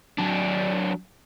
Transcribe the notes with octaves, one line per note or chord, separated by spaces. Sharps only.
F#3 D4